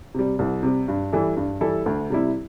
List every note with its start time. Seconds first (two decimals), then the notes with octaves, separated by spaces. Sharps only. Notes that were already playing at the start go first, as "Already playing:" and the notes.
0.14 C3 G3
0.39 C2
0.63 C3 G3
0.88 G2
1.12 E3 G3 E4 A4
1.37 G2
1.61 E3 G3 E4 A4
1.86 D2
2.10 C3 G3 E4